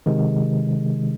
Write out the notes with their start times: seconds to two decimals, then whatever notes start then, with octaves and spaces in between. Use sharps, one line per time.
0.06 C3 D#3 G#3